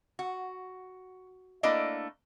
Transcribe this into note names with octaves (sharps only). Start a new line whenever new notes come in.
F#4
A3 A#3 D4 E4 D5 D#5